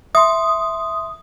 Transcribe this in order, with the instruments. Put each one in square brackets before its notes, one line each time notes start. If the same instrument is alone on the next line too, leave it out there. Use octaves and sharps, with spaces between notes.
[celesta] E5 C6 [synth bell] D#6